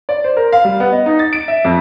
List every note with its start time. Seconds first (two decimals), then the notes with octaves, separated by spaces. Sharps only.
0.09 D5
0.24 C5
0.37 A#4
0.52 F5
0.65 G3
0.80 B3
0.92 D#5
1.06 D#4
1.19 A6
1.33 D7
1.48 E5
1.65 F2